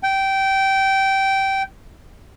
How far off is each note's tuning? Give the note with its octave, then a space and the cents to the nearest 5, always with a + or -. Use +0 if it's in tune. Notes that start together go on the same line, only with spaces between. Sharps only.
G5 -15